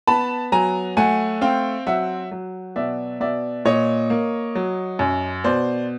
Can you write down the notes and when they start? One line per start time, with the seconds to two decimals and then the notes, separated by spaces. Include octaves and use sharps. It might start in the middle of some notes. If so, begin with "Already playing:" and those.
0.07 B3 A5 B5
0.52 F#3 G#5 A#5
0.97 A3 F#5 G#5
1.41 C4 F5 G5
1.87 F#3 E5 F#5
2.31 F#3
2.76 B2 D5 E5
3.20 B2 D5 E5
3.65 A#2 C#5 D#5
4.10 A#3
4.55 F#3
4.99 F#2
5.44 B2 C5 D5